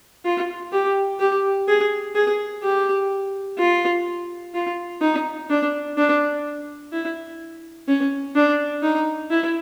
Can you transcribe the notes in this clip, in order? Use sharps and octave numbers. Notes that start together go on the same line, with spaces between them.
F4
G4
G4
G#4
G#4
G4
F4
F4
D#4
D4
D4
E4
C#4
D4
D#4
E4